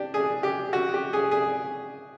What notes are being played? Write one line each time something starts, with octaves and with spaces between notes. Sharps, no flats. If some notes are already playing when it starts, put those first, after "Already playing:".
Already playing: D4 G4
G#4
G4
F#4
G4
G#4
G#4